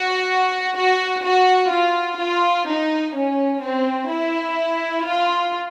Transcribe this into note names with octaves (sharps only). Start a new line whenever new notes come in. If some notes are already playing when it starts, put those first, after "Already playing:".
Already playing: F#4
F#4
F#4
F4
F4
D#4
C#4
C4
E4
F4